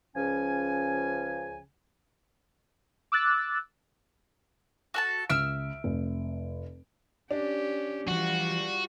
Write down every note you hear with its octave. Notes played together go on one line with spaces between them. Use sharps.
C#2 C#3 F3 C#4 G#5
D6 E6 F#6 A6
F#4 A4 A5
C#2 E5 E6 F6 D7
F1
C#4 D4 G4
E3 F3 G3 F4 F#4